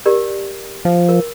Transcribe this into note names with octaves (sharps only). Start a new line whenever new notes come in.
G4 A#4 D5
F3
A#4